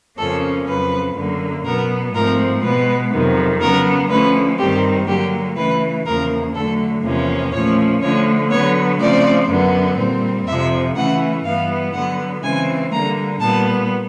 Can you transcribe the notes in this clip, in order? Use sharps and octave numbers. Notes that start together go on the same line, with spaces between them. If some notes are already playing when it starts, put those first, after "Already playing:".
F2 C#3 F3 A#3 C#4 A4
F2 C#3 F#3 B4
F#2 D3 F#3 A#3
B2 F#3 B3 A#4
G#2 F3 A3 C4 A#4
B2 G#3 B3 B4
F2 C3 D#3 F#3
C#3 F#3 B3 A#4
D3 F3 A3 C#4 B4
G2 D#3 G3 C4 G4
D3 F#3 A#3 G4
C#3 E3 A3 B4
E2 C#3 F3 A#3 A#4
D3 F#3 A3 A4
E2 C3 F3 A#3 C#4
A#2 F3 A3 C#4 C#5
D3 F3 A3 C#5
D3 F#3 B3 C#5
C#3 F3 A3 C4 D5
F#2 D3 F#3 B3
A#2 G3 C4
F2 C3 F3 E5
C#3 E3 A3 C#4 F#5
G2 E3 G3 B3 F5
D3 F#3 B3 F#5
C#3 E3 G#3 C4 G#5
D3 G3 A#3 A#5
A#2 G3 B3 A5